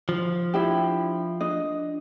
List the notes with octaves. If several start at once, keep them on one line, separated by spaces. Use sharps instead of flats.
F3
D4 E4 G4
D4 D#5